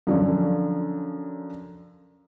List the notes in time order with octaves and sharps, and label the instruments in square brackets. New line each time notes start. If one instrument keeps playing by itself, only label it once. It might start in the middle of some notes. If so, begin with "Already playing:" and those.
[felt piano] F#2 D3 F3 C#4